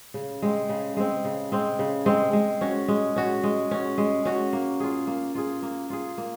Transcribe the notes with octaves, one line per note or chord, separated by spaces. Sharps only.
C#3
G#3 C4
C#3
G#3 C4
C#3
G#3 C4
C#3
G#3 C4
G#3
C#4 F#4
G#3
C#4 F#4
G#3
C#4 F#4
G#3
C#4 F#4
A#3
F4 G#4
A#3
F4 G#4
A#3
F4 G#4
A#3